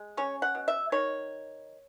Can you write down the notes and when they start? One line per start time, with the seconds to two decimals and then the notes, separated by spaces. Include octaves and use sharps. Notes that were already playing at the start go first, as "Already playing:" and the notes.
Already playing: G#3
0.17 C#4 C#5
0.42 F#5
0.55 B2
0.68 E5
0.92 D#3 C#5